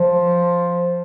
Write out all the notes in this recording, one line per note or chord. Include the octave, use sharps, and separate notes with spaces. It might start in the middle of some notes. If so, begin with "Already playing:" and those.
Already playing: F3